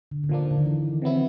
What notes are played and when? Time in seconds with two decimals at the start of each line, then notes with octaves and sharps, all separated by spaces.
0.11 D3
0.24 D3
0.29 A#2 D#3 F3 A#3 D4
0.51 D3
0.58 D#3
0.66 E3
1.02 C3 D#3 F#3 B3 E4